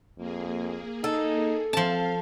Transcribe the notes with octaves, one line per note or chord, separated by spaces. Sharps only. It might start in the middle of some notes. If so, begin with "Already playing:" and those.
F2 A#3 G#4
D#4 A4
F3 C4 F5 A5